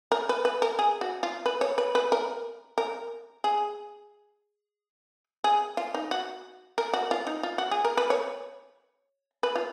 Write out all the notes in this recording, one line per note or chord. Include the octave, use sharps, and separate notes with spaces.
A#4
B4
B4
A#4
G#4
F#4
F4
B4
C#5
B4
B4
A#4
A#4
G#4
G#4
F4
D#4
F#4
A#4
F#4
F4
D#4
F4
F#4
G#4
A#4
B4
C#5
B4
F4